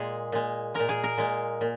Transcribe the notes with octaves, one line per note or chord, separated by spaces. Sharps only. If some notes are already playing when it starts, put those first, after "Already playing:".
Already playing: A#2 G#3 G#4
A#2 G#3
A#2 G#3 A#4
G#4
A#4
A#2 G#3
A#2